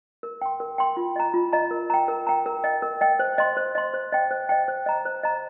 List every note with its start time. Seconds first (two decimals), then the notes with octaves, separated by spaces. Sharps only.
0.23 A#4
0.41 G5 C6
0.60 A#4
0.78 G5 C6
0.97 F4
1.16 D#5 A#5
1.34 F4
1.53 D#5 A#5
1.71 A#4
1.90 G5 A#5
2.08 A#4
2.27 G5 A#5
2.46 A#4
2.64 D#5 G5
2.82 A#4
3.01 D#5 G5
3.19 C5
3.38 D#5 C6
3.57 C5
3.75 D#5 C6
3.94 C5
4.12 D#5 G5
4.31 C5
4.49 D#5 G5
4.68 C5
4.86 D#5 A#5
5.05 C5
5.23 D#5 A#5